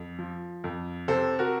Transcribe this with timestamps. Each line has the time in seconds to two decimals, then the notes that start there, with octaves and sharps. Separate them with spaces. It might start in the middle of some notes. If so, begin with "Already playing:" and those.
Already playing: F2
0.19 F3
0.64 F2
1.08 C3 A4 C5
1.39 F#4 A#4